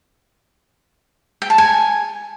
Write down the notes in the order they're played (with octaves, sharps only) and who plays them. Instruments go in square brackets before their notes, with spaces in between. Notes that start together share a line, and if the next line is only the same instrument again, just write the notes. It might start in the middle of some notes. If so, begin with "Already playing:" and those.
[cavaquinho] G5
A5
G#5